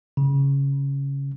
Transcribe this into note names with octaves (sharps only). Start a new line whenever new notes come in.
C#3